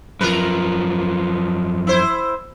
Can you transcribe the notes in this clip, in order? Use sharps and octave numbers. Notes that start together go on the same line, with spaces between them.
F#2 F3 A#4 B4
E4 C5